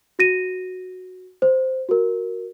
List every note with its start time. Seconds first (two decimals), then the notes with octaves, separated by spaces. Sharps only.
0.19 F#4 A#6 D#7
1.42 C5
1.89 F#4 A#4